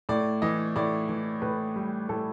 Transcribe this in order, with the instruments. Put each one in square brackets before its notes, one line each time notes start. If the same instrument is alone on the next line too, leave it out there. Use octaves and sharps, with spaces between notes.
[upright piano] A2 D5
E3 D#5
A2 D5
E3
A2 B4
G3
A2 A4